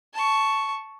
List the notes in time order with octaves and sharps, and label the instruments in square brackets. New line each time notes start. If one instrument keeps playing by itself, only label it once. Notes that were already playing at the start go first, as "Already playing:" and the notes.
[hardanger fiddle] A5 C#6